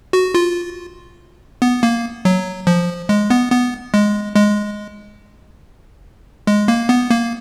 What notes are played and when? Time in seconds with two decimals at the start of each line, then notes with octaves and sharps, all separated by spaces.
0.13 F#4
0.34 F4
1.62 B3
1.83 A#3
2.25 F#3
2.67 F3
3.09 G#3
3.30 B3
3.52 B3
3.94 G#3
4.36 G#3
6.47 G#3
6.68 A#3
6.89 B3
7.10 A#3